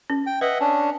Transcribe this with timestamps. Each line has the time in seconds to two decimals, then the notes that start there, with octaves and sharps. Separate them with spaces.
0.10 C#4
0.26 G5
0.41 B4 D#5 E5 F#5
0.60 C#4 D4